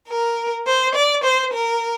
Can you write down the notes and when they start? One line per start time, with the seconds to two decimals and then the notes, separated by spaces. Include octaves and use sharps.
0.08 A#4
0.66 C5
0.94 D5
1.23 C5
1.52 A#4